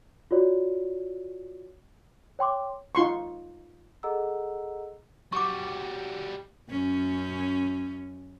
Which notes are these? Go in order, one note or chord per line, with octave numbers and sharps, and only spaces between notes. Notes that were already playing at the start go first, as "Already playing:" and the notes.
F4 F#4 C#5 D5
C#5 G5 C6 D6
D#4 F4 C6 C#6
G#4 A4 D#5 F#5 A#5 E6
G3 F#4 C#6 D6
F#2 C#4